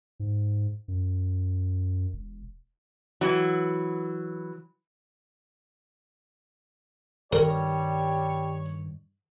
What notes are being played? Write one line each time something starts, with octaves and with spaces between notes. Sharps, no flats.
G#2
F#2
E1
E3 F#3
G2 D#3 G3 A#4 C#5